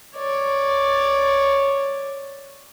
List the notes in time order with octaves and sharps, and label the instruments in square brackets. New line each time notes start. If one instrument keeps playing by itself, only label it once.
[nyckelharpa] C#5 D5